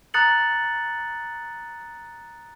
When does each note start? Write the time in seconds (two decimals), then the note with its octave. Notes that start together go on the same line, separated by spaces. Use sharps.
0.14 A#5 D#6 F#6 A6 C#7 F#7